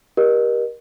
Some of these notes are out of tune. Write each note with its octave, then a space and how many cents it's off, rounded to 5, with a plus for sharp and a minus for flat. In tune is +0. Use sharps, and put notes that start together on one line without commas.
G4 +0 A#4 +25 D#5 -35